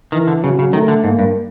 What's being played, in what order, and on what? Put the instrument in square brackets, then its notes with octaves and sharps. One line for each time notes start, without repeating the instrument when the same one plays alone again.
[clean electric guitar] D#3 [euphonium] E3
[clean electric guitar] D3
[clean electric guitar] C#3 [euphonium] F#3
[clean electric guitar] C#3
[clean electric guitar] D#3 [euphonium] A3
[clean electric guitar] D3
[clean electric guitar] G#2 [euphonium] A#3
[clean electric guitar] G2